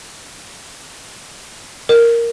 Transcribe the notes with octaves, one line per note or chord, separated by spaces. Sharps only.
A#4